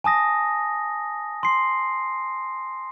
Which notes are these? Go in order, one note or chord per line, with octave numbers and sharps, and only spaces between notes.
G#5 A5 D#6 A#6
C6 C7